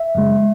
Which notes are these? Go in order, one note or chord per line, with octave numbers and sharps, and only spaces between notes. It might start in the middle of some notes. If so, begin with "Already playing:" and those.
Already playing: E5
F#2 C#3 G#3